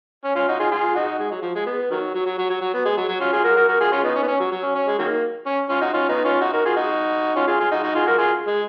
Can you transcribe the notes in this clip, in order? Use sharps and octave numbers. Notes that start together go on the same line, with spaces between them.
C#4
C#4 F4
D#4 F#4
F4 G#4
F4 G#4
D#4 F#4
G#3
F#3
F3
G#3
B3
D#3 F#3
F#3
F#3
F#3
F#3
F#3
B3
G#3
F#3
F#3
C#4 F4
F4 G#4
F#4 A#4
F#4 A#4
F#4 A#4
F4 G#4
C#4 F4
B3 D#4
C#4
B3
C#4
F#3
F#3
C#4
C#4
G#3
D#3 F#3 A#3
C#4
C#4 F4
D#4 F#4
C#4 F4
B3 D#4
C#4 F4
D#4 F#4
F#4 A#4
F4 G#4
D#4 F#4
C#4 F4
F4 G#4
F4 G#4
D#4 F#4
D#4 F#4
F4 G#4
F#4 A#4
F4 G#4
G#3